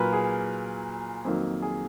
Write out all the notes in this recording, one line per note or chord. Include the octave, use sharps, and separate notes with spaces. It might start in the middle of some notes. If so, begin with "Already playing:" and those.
Already playing: A#2 F#3 A#3 A#4 B4
G#4
F2 D#3 F#3 A#3
G#4